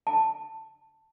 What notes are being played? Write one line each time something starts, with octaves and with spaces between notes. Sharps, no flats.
A5